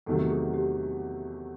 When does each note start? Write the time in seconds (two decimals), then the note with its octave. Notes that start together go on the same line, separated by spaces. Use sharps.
0.06 E2 C3 D#3 F#3 A3 A4
0.30 G#4
0.54 G4